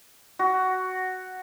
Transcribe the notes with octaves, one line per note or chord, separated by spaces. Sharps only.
F#4